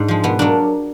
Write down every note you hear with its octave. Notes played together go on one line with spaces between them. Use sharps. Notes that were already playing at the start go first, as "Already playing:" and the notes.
Already playing: G#2 D4 G#4
F3 G#3
B2 B3
F#3 A#3 D4